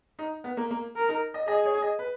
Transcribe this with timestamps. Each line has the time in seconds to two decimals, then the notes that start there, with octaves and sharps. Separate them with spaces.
0.19 D#4
0.44 B3
0.57 A#3
0.71 A#3
0.96 A#4
1.09 D#4
1.34 D#5
1.48 G#4 D#5
1.65 C#5
1.82 D#5
1.99 B4